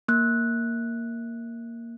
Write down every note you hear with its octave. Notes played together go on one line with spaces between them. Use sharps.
A#3 F#6